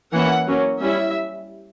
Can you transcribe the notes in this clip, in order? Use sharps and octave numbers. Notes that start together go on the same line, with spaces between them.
E3 A#3 C#4 E4 F#5
F#3 A#3 C#4
G3 C#4 E4 E5